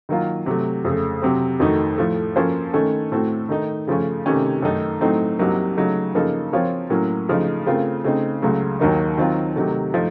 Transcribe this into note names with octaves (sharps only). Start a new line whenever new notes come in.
D#3 F#3 A#3 F4
C3 F#3 A3
F2 C#3 A3
C3 F#3 C4
F2 D#3 A3 D#4 F#4
A2 F3 A3
F3 A#3 C#4 A4 C5
D#3 A3 C#4 A4
A2 A3 C4 F#4 A4
D#3 A3 D#4
C#3 F3 A3 C#4
C3 D#3 A3 C#4
F#2 D#3 A3 D#4 A4
A2 F#3 A3 C4 D#4
C2 C3 F#3 A#3 D#4
C#3 F#3 A3 D#4
C#3 F3 A#3 D#4 A4
F3 C4 F4 A#4 C#5
A2 F#3 A#3 C#4
C#3 F3 A3 D#4
C#3 A3 C4 F4 A#4
C#3 A3 C4 D#4
C#2 C#3 F#3 A3
D#2 D#3 F#3 A#3 D#4
D#3 F#3 C4 F4
C3 D#3 F#3 A3
F3 A3 D#4